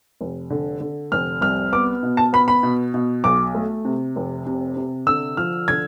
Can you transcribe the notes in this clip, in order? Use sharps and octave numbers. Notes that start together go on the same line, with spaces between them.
F1
D3
D3
F1 F6
C2 F6
B3 D6
B2
A5
B3 B5
B5
B2
B2
B1 D6
A3
C3
F1
C3
C3
D3 E6
F3 F6
D3 G#6